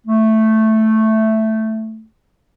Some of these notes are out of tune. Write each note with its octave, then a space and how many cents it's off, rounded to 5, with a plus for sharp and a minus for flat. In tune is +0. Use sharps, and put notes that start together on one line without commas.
A3 +0